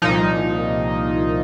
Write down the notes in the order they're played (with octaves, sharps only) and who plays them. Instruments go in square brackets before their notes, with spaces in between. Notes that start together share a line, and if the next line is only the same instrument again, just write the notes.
[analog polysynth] C2 A#2 F3 D#4